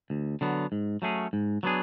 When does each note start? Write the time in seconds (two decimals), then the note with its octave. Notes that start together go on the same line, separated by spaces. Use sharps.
0.10 D2
0.41 D3 F#3 B3
0.72 G#2
1.02 F#3 A3 C#4 G#4
1.33 G#2
1.63 F#3 B3 D4 G#4